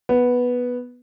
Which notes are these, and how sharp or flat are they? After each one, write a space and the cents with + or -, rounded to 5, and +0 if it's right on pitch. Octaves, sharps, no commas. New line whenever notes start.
B3 -5